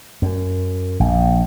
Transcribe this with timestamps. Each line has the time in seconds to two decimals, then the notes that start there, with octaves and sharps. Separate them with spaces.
0.22 F#2
1.00 A#1